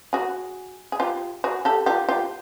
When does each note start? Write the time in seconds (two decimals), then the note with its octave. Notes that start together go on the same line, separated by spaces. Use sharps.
0.13 F#4 G#4
0.92 G#4
1.00 F4 G4
1.44 F#4 G#4
1.65 G4 A4
1.86 F4 G4
2.09 F4 G4